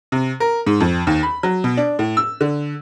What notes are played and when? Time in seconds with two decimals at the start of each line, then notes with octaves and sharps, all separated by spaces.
0.12 C3
0.40 A#4
0.67 G#2
0.80 F2
1.07 D#2
1.23 B5
1.43 F#3
1.64 B2
1.77 D4
1.99 A2
2.17 E6
2.41 D3